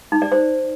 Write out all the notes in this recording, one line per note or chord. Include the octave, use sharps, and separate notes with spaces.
D#4
D5
C5